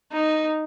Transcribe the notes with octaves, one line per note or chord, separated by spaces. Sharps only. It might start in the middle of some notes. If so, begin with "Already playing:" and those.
D#4